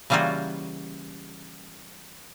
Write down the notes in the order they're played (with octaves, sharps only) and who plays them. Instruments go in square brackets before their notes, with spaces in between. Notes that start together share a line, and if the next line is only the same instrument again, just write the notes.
[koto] C#3 E3 G3 A#3 F4 F#4